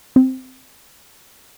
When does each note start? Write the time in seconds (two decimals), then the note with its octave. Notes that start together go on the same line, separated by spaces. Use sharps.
0.16 C4